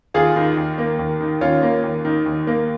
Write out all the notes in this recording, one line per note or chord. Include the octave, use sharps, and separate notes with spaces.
D#2 F4 G#4
D#3
D#2
A#3
D#2
D#3
D#2 C#4 F4
A#3
D#2
D#3
D#2
A#3